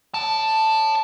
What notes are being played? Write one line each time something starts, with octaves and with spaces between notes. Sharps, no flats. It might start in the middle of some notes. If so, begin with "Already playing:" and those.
C#5 A5